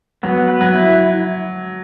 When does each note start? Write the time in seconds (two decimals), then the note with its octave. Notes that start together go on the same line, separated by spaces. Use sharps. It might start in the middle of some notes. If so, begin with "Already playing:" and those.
0.23 F#3 B3
0.48 B4
0.61 F#3
0.73 E4